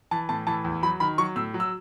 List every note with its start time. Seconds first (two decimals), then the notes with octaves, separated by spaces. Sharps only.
0.11 E3 A5
0.29 A2 A5
0.47 E3 A5
0.64 E2
0.83 F#3 B5
1.00 D#3 B5
1.18 F#3 C#6
1.36 A2 E6
1.54 F#3
1.60 E6